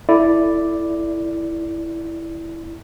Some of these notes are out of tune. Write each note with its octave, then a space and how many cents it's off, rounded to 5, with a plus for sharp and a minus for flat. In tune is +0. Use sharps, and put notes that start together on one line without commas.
E4 +0 A4 +0 D5 +0